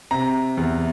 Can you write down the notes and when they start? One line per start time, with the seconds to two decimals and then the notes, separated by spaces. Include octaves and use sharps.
0.11 C3 A#5
0.57 E2